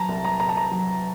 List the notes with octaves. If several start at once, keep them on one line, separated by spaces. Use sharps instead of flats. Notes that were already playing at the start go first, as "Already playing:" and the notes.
Already playing: F#3 A5 A#5
C2
A#5
C2 A#5
A5
A#5
F#3